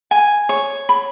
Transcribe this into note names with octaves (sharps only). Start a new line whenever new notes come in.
G#5
C#5
B5